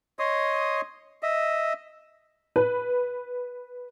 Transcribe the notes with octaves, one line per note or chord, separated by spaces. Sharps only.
C#5 D#5 C6 D#6
D#5 E5
B4